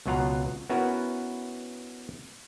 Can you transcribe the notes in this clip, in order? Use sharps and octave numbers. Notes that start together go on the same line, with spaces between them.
C#2 B2 F#3 F4 F#5 A#5
B3 C#4 E4 F#4 A#4 B4